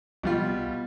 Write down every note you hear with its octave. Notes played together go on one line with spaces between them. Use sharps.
C2 B2 G3 F4